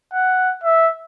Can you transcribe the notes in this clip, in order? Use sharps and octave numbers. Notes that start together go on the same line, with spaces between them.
F#5
E5